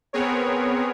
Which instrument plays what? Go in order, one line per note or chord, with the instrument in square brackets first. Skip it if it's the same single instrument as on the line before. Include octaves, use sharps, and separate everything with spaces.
[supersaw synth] B3 C4 G#4 A#4 C#5